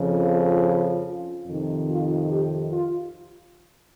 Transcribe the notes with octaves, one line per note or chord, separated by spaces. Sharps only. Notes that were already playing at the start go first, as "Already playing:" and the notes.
Already playing: F2 C#3 F3
F4
F4
F4
F2 C3 D#3
F4
G4
F4